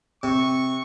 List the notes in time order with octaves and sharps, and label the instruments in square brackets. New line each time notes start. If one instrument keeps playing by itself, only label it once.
[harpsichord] C3 [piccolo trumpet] C#6